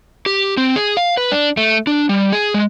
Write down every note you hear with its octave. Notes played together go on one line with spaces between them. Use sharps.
G4
C4
G#4
F5
B4
D4
A3
D4
G3
G#4
G#3